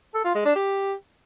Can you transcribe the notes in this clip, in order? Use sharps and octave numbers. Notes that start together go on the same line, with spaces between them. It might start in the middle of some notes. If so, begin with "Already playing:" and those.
A4
F4
G#3
D4
G4